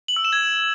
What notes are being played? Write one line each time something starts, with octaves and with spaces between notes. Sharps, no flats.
F#7
E6
E7
G#6